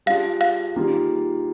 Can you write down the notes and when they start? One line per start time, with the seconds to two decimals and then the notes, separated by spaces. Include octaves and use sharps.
0.06 G3 D4 F4 G#4 F5
0.41 F5
0.76 D#3 G3 A#3 F4 G#4